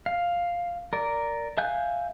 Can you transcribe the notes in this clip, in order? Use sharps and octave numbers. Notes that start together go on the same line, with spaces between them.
F5
A#4 D5
E5 F5 G#5 F#6 G6